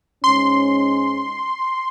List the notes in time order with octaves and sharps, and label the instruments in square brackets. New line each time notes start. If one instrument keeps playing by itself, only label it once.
[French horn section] G#2 G#3 C#4 [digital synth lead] C6